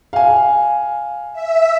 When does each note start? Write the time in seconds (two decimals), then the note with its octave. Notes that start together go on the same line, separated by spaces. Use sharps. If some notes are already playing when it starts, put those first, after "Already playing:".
0.13 F5 G#5
1.33 E5